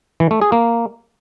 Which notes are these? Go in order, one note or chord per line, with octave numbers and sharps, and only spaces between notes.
E3
A3
G#4
A#3